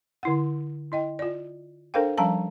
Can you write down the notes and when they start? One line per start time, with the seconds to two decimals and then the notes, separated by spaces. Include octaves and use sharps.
0.23 D3 E4 F#5
0.92 E4 D#5 G5
1.19 F4 D5
1.94 D4 A4 A#4 C5 F5 G5
2.17 F3 G3 C#4 F5 A5 A#5